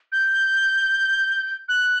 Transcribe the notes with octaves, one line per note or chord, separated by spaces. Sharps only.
G6
F#6